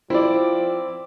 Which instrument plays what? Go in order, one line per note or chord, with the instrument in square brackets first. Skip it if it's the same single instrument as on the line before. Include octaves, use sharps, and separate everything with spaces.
[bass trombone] F3 [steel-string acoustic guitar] C4 [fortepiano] E4 D5